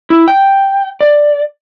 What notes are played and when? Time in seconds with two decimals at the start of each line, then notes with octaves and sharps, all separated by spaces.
0.10 E4
0.28 G5
1.01 D5